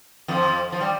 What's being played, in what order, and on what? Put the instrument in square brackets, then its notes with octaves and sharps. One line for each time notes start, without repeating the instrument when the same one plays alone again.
[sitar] F2 F3
F3
G3